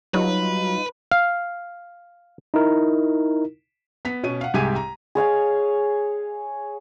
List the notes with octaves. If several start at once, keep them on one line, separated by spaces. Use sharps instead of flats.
F#3 G3 D#4 F4 B4
F5
D#4 E4 A#4
B3 B6
B2 C#4 D#7
F5 F#5
C2 G#2 G4 G#5 G#6 D#7
A#5
G#4 C#5 F5 G#5